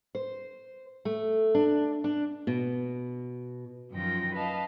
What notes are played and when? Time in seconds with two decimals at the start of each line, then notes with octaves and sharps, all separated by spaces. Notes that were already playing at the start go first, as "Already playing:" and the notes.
0.15 C5
1.05 A3
1.55 D4
2.04 D4
2.47 B2
3.93 F#2 D#3 F3 F4 G5 A#6
4.35 B4 D#5 F5 A5